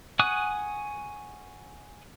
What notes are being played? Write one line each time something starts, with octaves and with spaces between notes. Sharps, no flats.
F#5 G#5 C#6 D#6 F#6